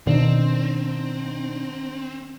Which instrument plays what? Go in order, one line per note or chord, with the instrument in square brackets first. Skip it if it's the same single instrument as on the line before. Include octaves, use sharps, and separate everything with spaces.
[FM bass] B2 [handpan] D#3 [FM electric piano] B3 D4 D#4 [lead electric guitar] C4